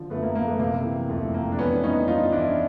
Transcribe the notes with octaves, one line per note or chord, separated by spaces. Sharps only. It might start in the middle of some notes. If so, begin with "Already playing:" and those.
Already playing: D3 F3
F#2 A3 B3
A#3
F#2 A#3
A3 B3
C3 A#3
E3
F2 A3
F2 A#3
D4
E3 B3 C#4
G2 C#4 D#4
G2 D#4 F4
E3 D4 E4